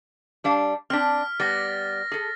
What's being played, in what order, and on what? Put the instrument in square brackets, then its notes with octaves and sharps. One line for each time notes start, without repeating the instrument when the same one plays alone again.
[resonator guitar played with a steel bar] G3 D4 F5
[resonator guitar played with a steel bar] C4 D4 [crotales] F6 B6
[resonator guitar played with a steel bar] G3 B3 [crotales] A6 A#6
[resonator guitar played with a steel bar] G#4 A4